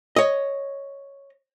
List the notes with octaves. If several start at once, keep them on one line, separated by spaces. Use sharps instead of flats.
C#5 D#5